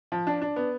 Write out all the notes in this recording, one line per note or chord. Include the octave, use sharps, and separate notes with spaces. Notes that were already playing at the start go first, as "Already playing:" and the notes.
F3
D4
D4
B3